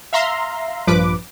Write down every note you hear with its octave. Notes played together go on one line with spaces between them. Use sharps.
E5 F5 A#5 C6
A#1 G2 F3 B4 D6